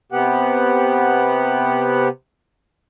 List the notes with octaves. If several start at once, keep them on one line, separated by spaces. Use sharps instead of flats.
C3 B3 G4 F#5